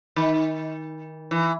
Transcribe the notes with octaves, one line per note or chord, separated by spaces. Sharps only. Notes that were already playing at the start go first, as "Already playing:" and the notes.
D#3
E3